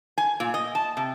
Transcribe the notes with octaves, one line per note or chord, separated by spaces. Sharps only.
G#5
A#2
D#5
A5
C3